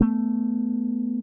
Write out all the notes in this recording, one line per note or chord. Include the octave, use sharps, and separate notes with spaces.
A3 B3